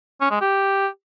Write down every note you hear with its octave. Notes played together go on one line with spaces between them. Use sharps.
C#4
G#3
G4